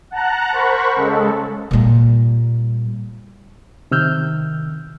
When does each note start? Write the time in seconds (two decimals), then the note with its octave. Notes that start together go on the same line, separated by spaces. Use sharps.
0.11 F#5 A5 A#5 F#6
0.52 A#4 C5 F#5 B5 C#6
0.96 C#3 G#3 A4
1.71 A#2 G3
3.91 C3 D#3 E6 F6 G6